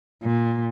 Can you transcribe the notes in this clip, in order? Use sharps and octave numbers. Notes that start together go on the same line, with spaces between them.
A#2